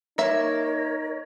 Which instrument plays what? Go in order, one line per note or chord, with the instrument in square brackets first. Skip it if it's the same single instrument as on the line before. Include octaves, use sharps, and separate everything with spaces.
[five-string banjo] A#3 E5 [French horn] D#4 [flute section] A#4 C#5